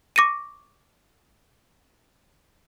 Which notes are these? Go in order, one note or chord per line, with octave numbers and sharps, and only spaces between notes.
C#6 D6 A#6 C#7 D#7